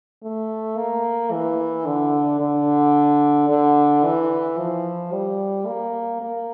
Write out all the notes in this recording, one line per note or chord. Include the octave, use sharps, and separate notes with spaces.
A3
A#3
E3
D3
D3
D3
E3
F3
G3
A#3
A#3